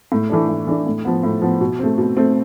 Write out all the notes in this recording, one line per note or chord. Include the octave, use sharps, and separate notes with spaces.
A2
E3 A3 D4
A2
E3 A3 D4
A2
F3 B3
A2
F3 B3
B2
A3 C4
B2
A3 C4